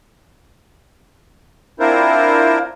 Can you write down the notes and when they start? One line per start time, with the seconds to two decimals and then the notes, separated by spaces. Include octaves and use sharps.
1.80 C4 D4 E4 F4 A#4 C5